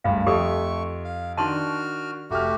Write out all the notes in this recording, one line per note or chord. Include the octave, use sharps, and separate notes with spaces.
F#1 D2 G2 F5
F2 A3 G4 A4 C#6
F5
D#3 D4 F#4 A5 C6 C#6 F6
F1 A3 F#4 G4 F6